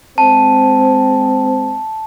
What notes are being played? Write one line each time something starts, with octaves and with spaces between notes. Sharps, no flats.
G#3 C4 A5